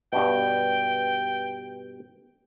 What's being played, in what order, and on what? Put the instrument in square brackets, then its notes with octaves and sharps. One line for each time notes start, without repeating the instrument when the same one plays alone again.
[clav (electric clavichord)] G2 B2 [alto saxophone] G5